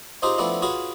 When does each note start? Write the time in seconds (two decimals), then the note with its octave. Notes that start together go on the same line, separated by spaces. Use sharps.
0.22 C4 D#4 F4 G4 G#4 C5
0.38 F3 A3 B3 C4 D4 E4
0.62 F4 F#4 G#4 B4 C#5